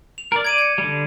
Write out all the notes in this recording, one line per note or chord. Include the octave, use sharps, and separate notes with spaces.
F7
A#4 D5
D5 G#6 D7 D#7
G#6 C#7
D3 G3